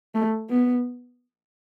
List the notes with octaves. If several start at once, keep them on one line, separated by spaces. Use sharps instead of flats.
A3
B3